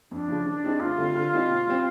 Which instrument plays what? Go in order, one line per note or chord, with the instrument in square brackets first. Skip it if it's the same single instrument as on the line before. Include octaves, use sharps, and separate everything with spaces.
[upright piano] F2 [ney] D4
[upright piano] C#3 F3
D#3
G3 C4 D#4 G#4
[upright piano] D2 [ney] F4
[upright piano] D3 G3 C4
D3
G3 C4 D#4 G4
B2
G3 C4